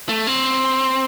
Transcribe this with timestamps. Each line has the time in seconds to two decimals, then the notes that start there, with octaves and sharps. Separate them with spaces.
0.09 A3
0.27 C4